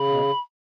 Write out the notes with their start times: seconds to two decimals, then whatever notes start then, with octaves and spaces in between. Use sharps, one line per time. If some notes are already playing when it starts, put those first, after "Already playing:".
Already playing: C#3 B5
0.08 B2